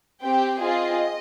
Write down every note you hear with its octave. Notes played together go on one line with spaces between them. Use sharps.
C4 G4 G5
C4 F4 G#4 D#5